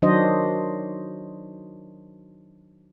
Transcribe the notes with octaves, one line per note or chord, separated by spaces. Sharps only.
D#3 F#3 D4 F#4 C5 D#5